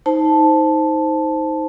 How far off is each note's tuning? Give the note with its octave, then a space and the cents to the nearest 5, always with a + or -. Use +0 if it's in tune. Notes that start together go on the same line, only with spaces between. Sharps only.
D#4 +20 C5 +0 A5 -5